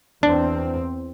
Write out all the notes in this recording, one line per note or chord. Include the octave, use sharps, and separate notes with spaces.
E2 C4 D4